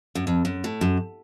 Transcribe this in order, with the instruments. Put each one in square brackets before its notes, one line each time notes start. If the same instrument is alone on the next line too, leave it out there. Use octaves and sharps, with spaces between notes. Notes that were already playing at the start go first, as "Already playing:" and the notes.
[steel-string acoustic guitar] F#2
F2
F#2
A2
F#2